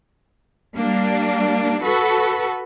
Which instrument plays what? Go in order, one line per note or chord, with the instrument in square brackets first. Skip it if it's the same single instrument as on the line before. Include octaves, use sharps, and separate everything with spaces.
[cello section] G3 A#3 D4
F#4 A4 B4